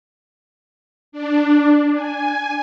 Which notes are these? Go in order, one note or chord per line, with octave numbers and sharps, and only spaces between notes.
D4
G#5